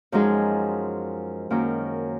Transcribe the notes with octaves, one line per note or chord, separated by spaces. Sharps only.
F#2 F3 G#3 D#4 G#4
F#2 D#3 A#3 C#4